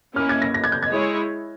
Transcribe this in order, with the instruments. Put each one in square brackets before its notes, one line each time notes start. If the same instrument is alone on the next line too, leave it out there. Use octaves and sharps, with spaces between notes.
[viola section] A#3 C#4 E4 [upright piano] F6
[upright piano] G#6
A#6
A#6
G#6
G6
G#6
[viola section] G#3 E4 G#4 C#5